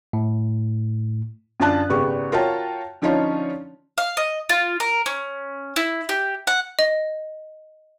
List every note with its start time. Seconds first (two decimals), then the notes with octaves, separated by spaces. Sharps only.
0.13 A2
1.60 F#2 D3 F4 D5 A5 F#6
1.89 G#1 C#3 B3 G4 C#6
2.32 F4 F#4 A#4 C#5 G5 A5
3.02 D3 F3 C#4 D#4 F4 C#5
3.98 F5
4.17 D#5
4.49 F4
4.80 A#4
5.06 C#4
5.76 E4
6.09 G4
6.47 F#5
6.79 D#5